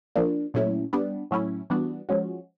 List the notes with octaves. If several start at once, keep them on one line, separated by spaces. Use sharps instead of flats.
F3 A#3 D4
A#2 F#3 A3 C#4 E4
G3 B3 D4
A2 F#3 A3 C#4 E4
E3 G3 B3 D4 F#4
F3 G#3 C#4 F#4